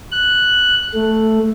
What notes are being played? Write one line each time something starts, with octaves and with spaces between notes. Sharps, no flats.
F#6
A3